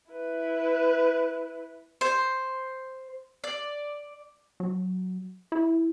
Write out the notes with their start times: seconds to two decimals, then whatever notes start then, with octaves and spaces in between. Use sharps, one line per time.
0.11 E4 B4
2.01 C5
3.44 D5
4.60 F#3
5.52 E4